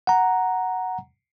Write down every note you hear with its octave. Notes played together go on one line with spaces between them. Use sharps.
F#5 A#5